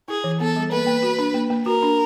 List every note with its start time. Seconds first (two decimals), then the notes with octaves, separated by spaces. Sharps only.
0.08 E4 G#4
0.24 E3
0.40 B3 A4
0.56 G3
0.71 A#3 B4
0.87 A#3
1.03 F#4
1.19 D4
1.34 A#3
1.50 A#3
1.66 F#4 A#4
1.83 D4